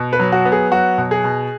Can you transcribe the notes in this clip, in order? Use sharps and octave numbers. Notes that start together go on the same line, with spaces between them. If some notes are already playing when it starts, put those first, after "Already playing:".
Already playing: B2
B4
F#3
F#4
B3
G#4
F#3 F#4
B2
G#4
B2